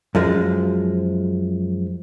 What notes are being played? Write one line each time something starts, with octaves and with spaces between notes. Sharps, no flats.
F#2 F3 G#3